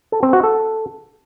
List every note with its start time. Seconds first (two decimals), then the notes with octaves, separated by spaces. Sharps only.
0.12 A4
0.23 C4
0.33 F#4
0.43 A4